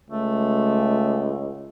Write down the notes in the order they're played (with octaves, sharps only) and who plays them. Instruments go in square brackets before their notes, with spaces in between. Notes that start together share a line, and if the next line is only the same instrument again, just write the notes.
[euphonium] C#2 [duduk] A3